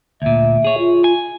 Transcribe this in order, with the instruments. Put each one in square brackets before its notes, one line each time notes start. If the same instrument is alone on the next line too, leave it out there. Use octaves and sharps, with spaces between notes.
[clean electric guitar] D2 A#2 [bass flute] E5
[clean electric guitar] G#4 C#5
[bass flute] F4
[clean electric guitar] G#5